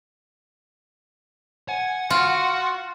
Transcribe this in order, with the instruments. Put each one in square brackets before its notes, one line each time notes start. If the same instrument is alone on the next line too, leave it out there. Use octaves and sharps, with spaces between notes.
[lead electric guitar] F#5 [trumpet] G#5
[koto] F4 [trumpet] F#4